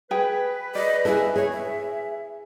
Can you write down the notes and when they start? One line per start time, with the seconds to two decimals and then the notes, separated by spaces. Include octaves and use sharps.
0.11 G#4 B4 G5
0.75 D5 D#5
1.05 E4 G#4 A4 E5
1.36 G#4 C#5
1.51 E5